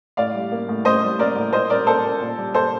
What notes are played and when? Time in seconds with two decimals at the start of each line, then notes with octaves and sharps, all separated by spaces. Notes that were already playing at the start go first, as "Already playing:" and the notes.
0.17 A2 D5 F5
0.34 G3
0.51 A#3
0.68 A2
0.85 A2 C5 D#5
1.02 G3
1.19 A#3 A#4 D5
1.36 A2
1.53 A#2 C5 D#5
1.70 G3 A#4 D5
1.87 A#3 A4 C5
2.04 A#2
2.21 A#2
2.38 G3
2.54 A#3 A4 C5